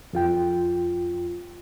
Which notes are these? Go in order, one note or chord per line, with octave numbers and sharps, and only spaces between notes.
F2 F4 G5